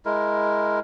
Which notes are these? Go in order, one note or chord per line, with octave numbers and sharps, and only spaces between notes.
G#3 E4 A#4